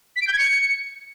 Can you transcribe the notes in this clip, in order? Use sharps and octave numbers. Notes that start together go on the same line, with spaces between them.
B6
D7
G6
G#6
C#7